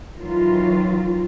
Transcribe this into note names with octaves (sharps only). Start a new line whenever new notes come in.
D#3 E3 F#3 F4